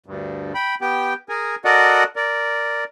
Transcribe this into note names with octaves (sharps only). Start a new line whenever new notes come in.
D2 G2
G5 B5
B3 G4 G5
G#4 A#4 G#5
F#4 A4 A#4 D5 D#5 F#5
A#4 D5